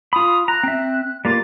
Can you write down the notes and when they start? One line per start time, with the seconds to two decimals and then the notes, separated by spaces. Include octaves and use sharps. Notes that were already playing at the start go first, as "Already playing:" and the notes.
0.13 F4 B5 D#6
0.48 A#5 F#6
0.63 C4 E5
1.25 G3 A#3 F4 A6